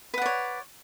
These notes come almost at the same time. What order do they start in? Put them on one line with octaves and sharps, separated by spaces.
B4 F#5 D5 C#5